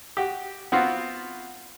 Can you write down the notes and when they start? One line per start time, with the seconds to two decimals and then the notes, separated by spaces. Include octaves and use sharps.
0.17 F#4 G4
0.72 B3 C4 F4 F#4